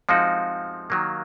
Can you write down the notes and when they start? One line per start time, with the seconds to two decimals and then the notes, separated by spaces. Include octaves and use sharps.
0.09 F3 G#3 C4 D#4 F#4 F5
0.90 D#3 F#3 A#3